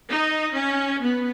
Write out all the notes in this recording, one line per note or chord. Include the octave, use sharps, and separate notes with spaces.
D#4
C#4
B3